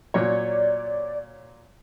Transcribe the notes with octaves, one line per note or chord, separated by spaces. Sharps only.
A#2 F#3 C#5 D5